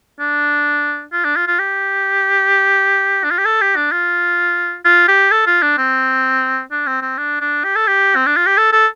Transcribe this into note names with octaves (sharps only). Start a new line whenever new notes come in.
D4
F4
D4
F4
F4
G4
D4
F4
G4
A4
G4
D4
F4
F4
G4
A4
F4
D4
C4
D4
C4
C4
D4
D4
G4
A4
G4
C4
D4
F4
G4
A4
A4